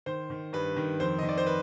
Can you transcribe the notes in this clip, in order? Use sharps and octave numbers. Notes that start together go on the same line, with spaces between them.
D#3 C5
D#3
G2 B4
D#3
F2 C5
D#5
D#3
D5
C5
B4